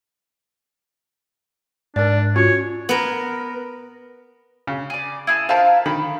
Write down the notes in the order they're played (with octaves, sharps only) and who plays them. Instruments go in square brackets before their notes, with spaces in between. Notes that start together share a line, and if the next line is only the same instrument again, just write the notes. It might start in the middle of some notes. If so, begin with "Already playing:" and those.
[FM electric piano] G#2 [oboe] D4 [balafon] A#4 D5
[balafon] C#4 F4 F#4 [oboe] C#5
[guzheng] B3 A#4
[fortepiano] C#3
[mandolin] G#4 D5
E4 G#4 A5
[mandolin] F4 A#4 F5 [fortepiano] C5 E5 A5
[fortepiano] D#3 [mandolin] B5